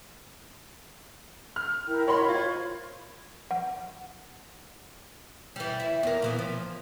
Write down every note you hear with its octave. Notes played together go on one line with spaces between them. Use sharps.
F6
E4 A#4 G5
F#4 A#4 C#5 D#5 B5 C6
F4 C5 C#6 G#6
F#5
E3 G3
E4
E2 A#4
A#2 E3 B3
F3